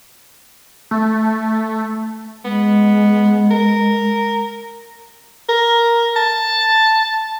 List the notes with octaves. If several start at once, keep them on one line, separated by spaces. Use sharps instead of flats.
A3
G#3 B3
A#4
A#4
A5